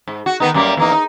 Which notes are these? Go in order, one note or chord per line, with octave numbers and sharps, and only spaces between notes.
G#2
F#4
D#3 B3 D#4
F#2 G3 A#3
E2 A#3 D#4
D#4